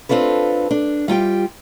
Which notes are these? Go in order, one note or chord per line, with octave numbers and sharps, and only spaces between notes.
C4 D4 F4 A4 B4
D4
G3 F4 G4 G5